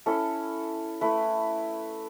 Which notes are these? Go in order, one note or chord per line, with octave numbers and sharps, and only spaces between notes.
C#4 E4 A4
A3 E4 B4